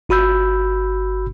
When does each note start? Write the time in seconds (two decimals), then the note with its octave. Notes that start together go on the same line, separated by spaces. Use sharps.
0.09 G1 F#4 B5 E6 G6